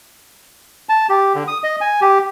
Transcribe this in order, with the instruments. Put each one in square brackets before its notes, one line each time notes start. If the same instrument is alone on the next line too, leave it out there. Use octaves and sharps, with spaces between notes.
[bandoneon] A5
G4
D3
D#6
D#5
G#5
G4